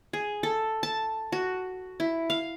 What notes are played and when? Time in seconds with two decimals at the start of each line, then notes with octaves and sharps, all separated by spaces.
0.13 G#4
0.43 A4
0.83 A5
1.32 F#4
2.00 E4
2.30 F5